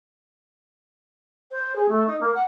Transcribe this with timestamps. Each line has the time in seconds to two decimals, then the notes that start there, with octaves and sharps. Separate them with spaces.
1.51 C5
1.76 G#4
1.89 A3
2.07 D#4
2.21 A#3
2.35 F#5